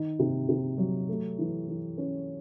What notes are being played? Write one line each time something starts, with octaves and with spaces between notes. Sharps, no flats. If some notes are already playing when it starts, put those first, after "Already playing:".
Already playing: D#3 D#4
C3
C3
F#3
A3
E3
E3
C#4